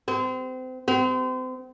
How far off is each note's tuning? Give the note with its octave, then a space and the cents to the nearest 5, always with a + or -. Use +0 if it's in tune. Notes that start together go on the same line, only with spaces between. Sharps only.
C4 -30
C4 -35